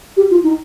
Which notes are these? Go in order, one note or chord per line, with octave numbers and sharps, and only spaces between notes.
G4
F4
D#4